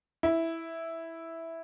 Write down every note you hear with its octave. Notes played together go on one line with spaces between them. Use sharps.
E4